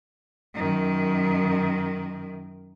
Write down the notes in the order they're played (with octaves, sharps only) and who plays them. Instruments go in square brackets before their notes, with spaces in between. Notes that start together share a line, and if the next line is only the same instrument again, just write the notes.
[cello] F#2 D#3